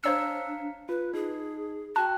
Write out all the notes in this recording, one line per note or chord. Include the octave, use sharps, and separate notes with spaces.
D4 C5 C#5 F5 A#5 E6 C#7
F4 B4
D#4 G#4
F#4 G5 A5 F#6